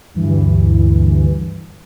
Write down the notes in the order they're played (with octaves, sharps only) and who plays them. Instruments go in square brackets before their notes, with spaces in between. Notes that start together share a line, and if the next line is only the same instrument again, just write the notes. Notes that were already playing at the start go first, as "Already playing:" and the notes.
[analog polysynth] D2 G2 E3